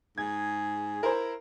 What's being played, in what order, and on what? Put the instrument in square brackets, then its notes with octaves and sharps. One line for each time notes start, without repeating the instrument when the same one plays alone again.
[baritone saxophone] G#2 [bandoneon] G#4 [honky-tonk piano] G#6
[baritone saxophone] E4 [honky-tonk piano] A#4 C5